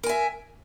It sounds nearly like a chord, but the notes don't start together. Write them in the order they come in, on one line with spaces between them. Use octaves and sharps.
A#4 G#5 E5